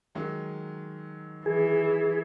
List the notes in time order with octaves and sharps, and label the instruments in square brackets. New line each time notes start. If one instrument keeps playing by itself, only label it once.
[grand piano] D#3 F#3 G#3
[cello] E3 [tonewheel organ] G#4